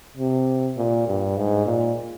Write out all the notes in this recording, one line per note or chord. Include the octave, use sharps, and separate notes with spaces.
C3
A#2
G2
G#2
A#2